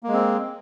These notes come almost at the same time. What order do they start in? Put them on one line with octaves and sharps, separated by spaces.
A#3 G#3 C4